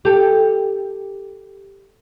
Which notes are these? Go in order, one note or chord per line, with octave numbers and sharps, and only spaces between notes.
G4 A4